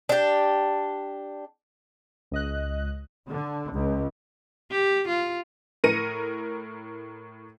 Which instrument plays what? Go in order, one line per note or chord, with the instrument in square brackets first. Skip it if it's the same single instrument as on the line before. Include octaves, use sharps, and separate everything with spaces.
[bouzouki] D4 G4
[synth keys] C#2 D#5 F#6
[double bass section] D3
C#2
[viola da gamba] G4
F4
[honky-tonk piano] A2 A#4 A#6 C#7 D#7